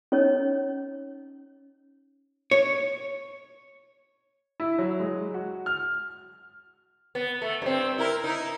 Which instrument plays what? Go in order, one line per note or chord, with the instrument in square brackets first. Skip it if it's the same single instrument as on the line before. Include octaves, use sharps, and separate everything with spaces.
[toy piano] C#4 D#4 C#5
[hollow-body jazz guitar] C#5
[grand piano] E4
F#3
G#3
F#4
F6
[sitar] B3
A3
G2 C4
E4 A#4
D#4 E4